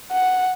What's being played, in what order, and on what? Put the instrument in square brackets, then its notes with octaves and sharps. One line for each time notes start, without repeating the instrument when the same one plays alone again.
[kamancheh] F#5